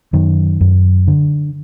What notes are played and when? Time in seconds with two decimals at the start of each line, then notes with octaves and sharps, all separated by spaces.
0.13 F#2 D#3
0.61 F#2
1.08 D3